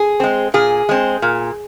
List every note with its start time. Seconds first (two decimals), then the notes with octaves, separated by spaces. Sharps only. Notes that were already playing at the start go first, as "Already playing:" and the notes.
Already playing: G#4
0.20 G#3 C4
0.54 A#2 G#4
0.89 G#3 C4
1.22 A#2